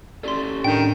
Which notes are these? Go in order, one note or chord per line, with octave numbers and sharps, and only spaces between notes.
C#4 G4 A4 D5 C6
A2 D#3 D4 G5 G6